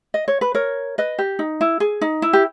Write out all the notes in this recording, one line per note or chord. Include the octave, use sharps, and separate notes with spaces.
D#5
C#5
B4
A#4 C#5
B4 D#5
G4
D#4
E4
G#4
D#4
E4
G4